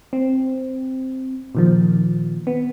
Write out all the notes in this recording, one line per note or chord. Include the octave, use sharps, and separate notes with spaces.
C4
A#2 D#3 F3
B3